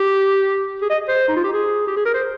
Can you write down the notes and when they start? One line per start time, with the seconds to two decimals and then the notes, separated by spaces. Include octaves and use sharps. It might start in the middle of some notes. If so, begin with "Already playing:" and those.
Already playing: G4
0.82 G#4
0.90 D#5
1.09 C5
1.28 D#4
1.36 F4
1.44 G4
1.53 G#4
1.87 G4
1.96 G#4
2.05 A#4
2.14 C5